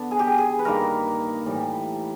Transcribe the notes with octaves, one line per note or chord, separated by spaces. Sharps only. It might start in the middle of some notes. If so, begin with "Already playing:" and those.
Already playing: D3 B3
G#4
G4
G#4
G#4
B4
G2 D#3 G3 A#3 A#4
A2 E3 G3